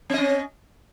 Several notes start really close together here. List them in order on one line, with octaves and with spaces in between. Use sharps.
C4 D#5 C#4